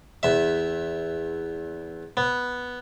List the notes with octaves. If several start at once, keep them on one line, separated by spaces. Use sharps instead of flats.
E2 E5
B3